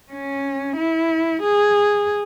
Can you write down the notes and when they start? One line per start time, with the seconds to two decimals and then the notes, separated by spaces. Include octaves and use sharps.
0.12 C#4
0.77 E4
1.43 G#4